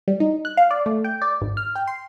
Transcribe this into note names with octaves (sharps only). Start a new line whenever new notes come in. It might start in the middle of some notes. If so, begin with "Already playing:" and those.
G3
D#4
F#6
F5
D5
A3
G5
D5
G#1
F6
G5
C6